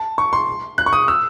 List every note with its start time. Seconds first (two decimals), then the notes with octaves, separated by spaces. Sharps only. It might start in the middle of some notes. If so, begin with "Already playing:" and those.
Already playing: A5
0.18 C#6
0.33 C6
0.78 F#6
0.86 C#6
0.93 D#6
1.08 E6